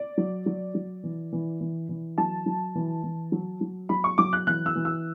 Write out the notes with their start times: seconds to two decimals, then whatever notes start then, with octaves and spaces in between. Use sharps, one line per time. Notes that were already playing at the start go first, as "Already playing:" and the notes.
Already playing: D5
0.18 F#3
0.46 F#3
0.75 F#3
1.04 E3
1.33 E3
1.61 E3
1.89 E3
2.18 F#3 A5
2.46 F#3
2.75 E3
3.04 E3
3.32 F#3
3.61 F#3
3.89 F#3 B5
4.04 C#6
4.18 F#3 D6
4.33 F#6
4.47 E3 F#6
4.66 E6
4.76 E3
4.85 E6